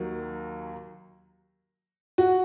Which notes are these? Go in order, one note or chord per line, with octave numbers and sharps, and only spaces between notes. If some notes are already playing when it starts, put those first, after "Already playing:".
Already playing: D#2 D#3 F#3
F#4